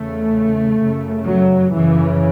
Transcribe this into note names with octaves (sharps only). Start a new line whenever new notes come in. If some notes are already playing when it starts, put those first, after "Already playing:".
Already playing: E2 C#3 A3
F#2 C#3
F#3
F#2 C#3 E3